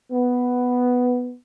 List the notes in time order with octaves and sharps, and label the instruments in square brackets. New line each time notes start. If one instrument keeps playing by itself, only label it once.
[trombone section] B3